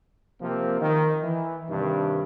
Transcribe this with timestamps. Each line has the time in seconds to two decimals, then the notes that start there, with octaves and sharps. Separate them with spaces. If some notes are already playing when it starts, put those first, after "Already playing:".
0.42 C3 F3 A#3 C4
0.81 D#3
1.23 E3
1.70 G2 C3 D#3 D4